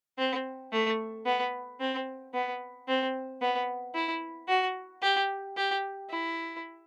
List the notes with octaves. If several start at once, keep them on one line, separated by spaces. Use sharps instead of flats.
C4
A3
B3
C4
B3
C4
B3
E4
F#4
G4
G4
E4